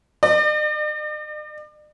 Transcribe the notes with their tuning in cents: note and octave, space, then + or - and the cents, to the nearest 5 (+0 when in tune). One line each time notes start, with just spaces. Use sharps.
D5 +45